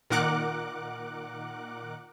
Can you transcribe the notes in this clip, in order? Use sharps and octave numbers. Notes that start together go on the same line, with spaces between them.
A#2 D#3 A#4 F#5 D6 F#6